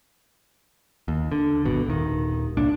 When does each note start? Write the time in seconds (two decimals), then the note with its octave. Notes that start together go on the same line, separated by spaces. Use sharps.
1.08 D#2
1.32 D3
1.65 G#1 B2
1.86 D#1 D#3
2.57 C2 A#2 D4